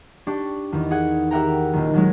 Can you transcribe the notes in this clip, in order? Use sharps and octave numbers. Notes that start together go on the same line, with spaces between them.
D4 G4 C#6
E2 D#3
G#4 F#5 G#6
G4 A#4 E5 F#5 G5 A#5
D#1 D#3
D#3 F#3 G#3